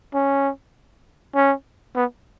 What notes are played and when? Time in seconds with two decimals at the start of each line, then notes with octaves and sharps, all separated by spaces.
0.14 C#4
1.35 C#4
1.96 B3